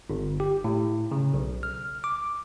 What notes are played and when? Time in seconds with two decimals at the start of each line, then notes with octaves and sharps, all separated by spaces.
0.10 G1
0.40 G4
0.64 A2
1.12 C#3
1.33 B1
1.63 F6
2.04 D6